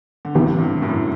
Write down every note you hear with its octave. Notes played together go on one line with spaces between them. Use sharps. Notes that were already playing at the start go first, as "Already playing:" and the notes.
D3
A2 C3 E3 B3 E4 G4
G2
F#2 A2